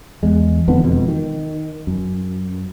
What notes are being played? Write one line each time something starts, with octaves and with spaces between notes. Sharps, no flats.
E2 G#3
F2 D3 E3 B3
E1 F2 B2
D#3
F#2